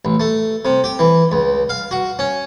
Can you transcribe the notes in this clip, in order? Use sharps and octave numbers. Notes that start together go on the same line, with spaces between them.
A1
A3
C3
G4
E3
C#2
F5
F#4
C#4